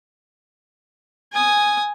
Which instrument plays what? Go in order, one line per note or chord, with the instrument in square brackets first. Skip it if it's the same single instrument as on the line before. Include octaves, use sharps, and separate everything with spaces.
[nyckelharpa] G#5 D#6